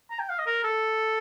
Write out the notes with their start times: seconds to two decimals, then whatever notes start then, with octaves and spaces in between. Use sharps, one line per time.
0.10 A#5
0.19 G5
0.29 F5
0.38 D#5
0.46 A#4
0.64 A4